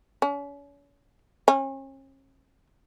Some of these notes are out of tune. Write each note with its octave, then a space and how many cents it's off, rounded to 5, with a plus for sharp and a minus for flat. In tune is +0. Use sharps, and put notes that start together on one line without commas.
C#4 +40
C#4 -40